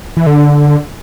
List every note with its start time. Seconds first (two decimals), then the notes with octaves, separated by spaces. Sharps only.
0.17 E3
0.27 D3